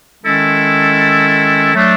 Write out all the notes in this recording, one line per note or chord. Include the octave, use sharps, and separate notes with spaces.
D#3 G#3 C#4 E4 A4
F#3 A3 D4